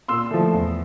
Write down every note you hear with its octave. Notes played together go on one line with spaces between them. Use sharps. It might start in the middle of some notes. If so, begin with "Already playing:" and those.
A#2 C6 E6
F3 A3
E2